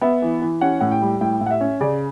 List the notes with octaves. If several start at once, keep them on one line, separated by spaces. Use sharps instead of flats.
B3 E5
E3
E3
C#4 F#5
A2 F#5
G5
G3
A2 G5
A2
F#5
E5
C#4
C#3 D5